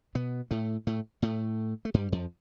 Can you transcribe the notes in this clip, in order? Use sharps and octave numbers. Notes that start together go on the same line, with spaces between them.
B2 B3
A2 A3
A2 A3
A2 A3
A3
G2 G3
F2 F3